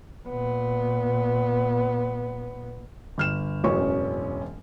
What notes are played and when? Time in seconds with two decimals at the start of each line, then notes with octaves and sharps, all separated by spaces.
0.27 A#2 B3
3.18 G1 F6 E7
3.64 E1 A1 F#2 C#4 C#6